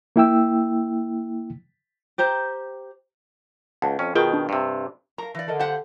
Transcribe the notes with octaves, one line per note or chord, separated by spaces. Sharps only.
A#3 E4 G5 E6
G4 C5 A#5
C#2 F#5 A5
F2 C#4
B2 D#3 F4 G#4 A#4 G5
D4
G2 C3
A#4 F5 A#5
E3 D5 F5
D3 A4 A#4 D#5
G4 C5 F5 F#5